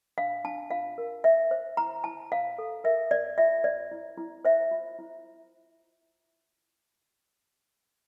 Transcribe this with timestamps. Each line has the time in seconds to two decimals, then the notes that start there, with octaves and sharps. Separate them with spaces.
0.18 D4 F5
0.44 D4 A5
0.70 F4 F5
0.98 A#4
1.24 C5 E5
1.51 C5
1.77 E4 A#5
2.04 E4 A5
2.32 C5 F5
2.58 A4
2.84 A#4 E5
3.11 A#4 D5
3.38 F4 E5
3.64 C5 D5
3.92 E4
4.18 E4
4.45 C5 E5
4.71 F4
4.99 E4